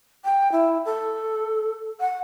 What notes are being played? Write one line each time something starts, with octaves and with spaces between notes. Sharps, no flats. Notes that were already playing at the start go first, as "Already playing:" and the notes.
G5
E4
A4
F#5